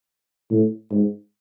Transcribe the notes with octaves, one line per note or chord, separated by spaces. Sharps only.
A2
G#2